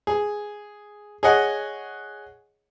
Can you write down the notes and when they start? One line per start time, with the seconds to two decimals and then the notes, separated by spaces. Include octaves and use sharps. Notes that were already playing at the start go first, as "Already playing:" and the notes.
0.07 G#4
1.23 G#4 C#5 D#5 F#5